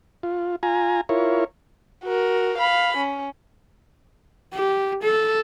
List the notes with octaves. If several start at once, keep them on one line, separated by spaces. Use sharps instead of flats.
F4
F4 G#5 A#5
E4 F4 A#4 C#5
F#4 A#4
F5 B5
C#4
G4
A4